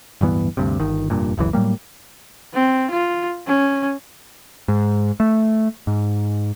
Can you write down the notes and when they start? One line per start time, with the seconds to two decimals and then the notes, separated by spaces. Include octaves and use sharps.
0.21 D1 G2 E3 B3
0.57 D2 G2 C3
0.80 G1 D#3
1.10 F1 G2 A#2
1.38 F1 C#2 F#2 E3
1.53 A2 F#3 G3 A#3
2.53 C4
2.91 F4
3.47 C#4
4.68 G#2
5.20 A3
5.87 G#2